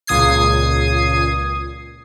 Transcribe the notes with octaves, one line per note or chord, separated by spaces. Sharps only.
C#2 A#2 D#6 G#6 C7